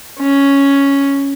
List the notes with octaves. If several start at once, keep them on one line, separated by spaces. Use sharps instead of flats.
C#4